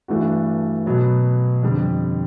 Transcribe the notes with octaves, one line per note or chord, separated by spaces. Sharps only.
G2 E3 A3 D4 F#4
B2 F#3 B3
F2 D3 G3